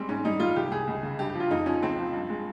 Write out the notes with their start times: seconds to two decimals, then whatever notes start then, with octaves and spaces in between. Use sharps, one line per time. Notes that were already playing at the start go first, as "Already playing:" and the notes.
Already playing: G3 G#3 C4
0.09 G#2 C#4
0.25 G3 D#4
0.40 G3 F4
0.56 C2 G4
0.71 C2 G#4
0.87 C#2
1.03 C#3
1.19 G2 G4
1.30 G4
1.35 F3
1.40 F4
1.51 F2 D#4
1.66 F3 C#4
1.82 C#2 C4
1.98 F3
2.13 G2
2.30 G#3